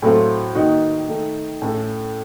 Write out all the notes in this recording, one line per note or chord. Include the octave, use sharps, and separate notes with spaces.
A2 F#3 A3 C4 F4
D#3 A#3 D#4 F#4
D#3 A3 D#4
A2 A3 C#4 A4